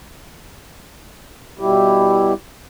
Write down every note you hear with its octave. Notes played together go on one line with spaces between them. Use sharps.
B2 G3 E4 G4